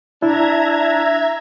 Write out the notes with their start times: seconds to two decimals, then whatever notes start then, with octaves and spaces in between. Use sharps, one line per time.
0.22 D4 E4 E5 A#5 G#6